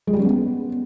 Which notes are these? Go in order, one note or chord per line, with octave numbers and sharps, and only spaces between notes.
G#3
G3
C#4
B3